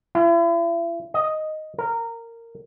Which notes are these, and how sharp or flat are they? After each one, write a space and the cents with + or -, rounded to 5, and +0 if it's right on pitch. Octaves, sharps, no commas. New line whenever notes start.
E4 +40
D#5 +0
A#4 -15